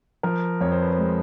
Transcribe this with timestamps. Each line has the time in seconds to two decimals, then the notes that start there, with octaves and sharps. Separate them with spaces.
0.23 F3 A#4
0.61 F2 C#5
0.72 C5
0.82 B4
0.92 C5
0.98 G#3